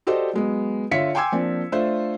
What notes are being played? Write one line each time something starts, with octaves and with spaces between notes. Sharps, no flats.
F#4 G4 A4 C5 D5 D#5
F#3 G#3 B3
D3 F4 C#5 E5 B6 C#7
G5 G#5 C6 D6 E6 G#6
F3 A#3 C4 D4
A3 D4 F4 A4 C5 E5